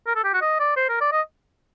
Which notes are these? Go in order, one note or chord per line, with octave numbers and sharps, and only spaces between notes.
A#4
A4
G4
F#4
D#5
D5
C5
A#4
D5
D#5